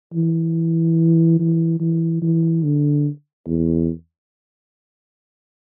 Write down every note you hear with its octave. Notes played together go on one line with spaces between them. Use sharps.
E3
E3
E3
E3
D3
E2